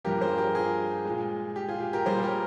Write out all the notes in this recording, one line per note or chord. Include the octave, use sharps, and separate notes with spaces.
G2 F3 A#3 G4 A#4
G#4 C5
G4 A#4
F4 G#4
A#2 G#3
G4
F4 G#4
G4
G4 A#4
A#2 G3 A#3 G#4 C5
G4 A#4